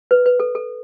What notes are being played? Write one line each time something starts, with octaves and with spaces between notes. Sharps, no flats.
B4
B4
A4
A4